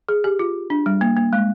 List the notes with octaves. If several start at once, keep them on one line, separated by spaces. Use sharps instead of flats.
G#4
G4
F4
D4
G3
A#3
A#3
G#3